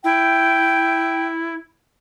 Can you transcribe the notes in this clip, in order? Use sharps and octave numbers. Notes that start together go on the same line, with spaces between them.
E4 G5